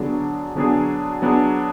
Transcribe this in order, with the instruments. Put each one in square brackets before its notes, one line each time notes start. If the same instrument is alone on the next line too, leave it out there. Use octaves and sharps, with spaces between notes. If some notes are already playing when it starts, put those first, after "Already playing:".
Already playing: [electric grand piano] D3 F#3 B3 D4 G#4
D3 F#3 B3 D4 G#4
F#3 B3 D4 G#4